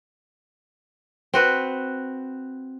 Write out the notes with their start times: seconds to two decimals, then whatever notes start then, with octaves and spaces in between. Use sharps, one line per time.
1.34 C4 F#4 B4